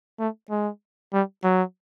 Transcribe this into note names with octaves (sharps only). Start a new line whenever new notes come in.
A3
G#3
G3
F#3